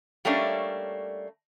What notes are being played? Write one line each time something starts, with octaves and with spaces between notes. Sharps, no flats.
G3 A3 A#3 C#4 D4